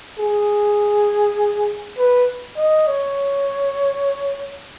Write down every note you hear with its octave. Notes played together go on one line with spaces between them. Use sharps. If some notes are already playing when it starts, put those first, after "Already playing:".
G#4
B4
D#5
C#5